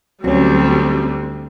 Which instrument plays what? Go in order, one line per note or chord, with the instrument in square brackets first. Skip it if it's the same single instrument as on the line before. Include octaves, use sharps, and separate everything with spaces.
[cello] D2 [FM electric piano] F#3 C#4 [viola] G3 C4